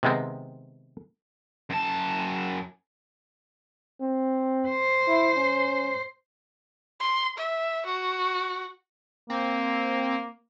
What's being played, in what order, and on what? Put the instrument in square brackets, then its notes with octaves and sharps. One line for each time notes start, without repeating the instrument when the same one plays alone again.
[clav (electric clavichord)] C3 D#3 G#3 B3 C4
[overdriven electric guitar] F#2 A5
[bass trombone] C4
[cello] C5
[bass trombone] E4
C#4
[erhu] C6
E5
F#4
[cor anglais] A#3 [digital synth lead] C4